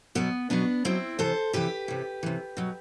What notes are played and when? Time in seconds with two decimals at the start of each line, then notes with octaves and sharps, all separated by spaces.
0.15 B2 F#3 B3
0.50 B2 F#3 B3 D4
0.85 B2 F#3 C4 E4
1.19 C3 E3 A4 C5
1.53 C3 E3 G4 B4
1.88 C3 E3
2.23 C3 E3
2.57 B2 F#3